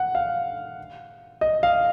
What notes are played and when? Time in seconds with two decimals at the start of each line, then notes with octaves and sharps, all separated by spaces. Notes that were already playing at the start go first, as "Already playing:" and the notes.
Already playing: F#5
0.15 F5
1.41 D#5
1.63 F5